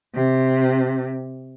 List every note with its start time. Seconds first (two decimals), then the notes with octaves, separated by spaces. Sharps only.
0.15 C3